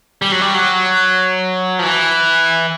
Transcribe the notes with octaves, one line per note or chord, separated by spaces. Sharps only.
G3
F#3
G3
F#3
F3
E3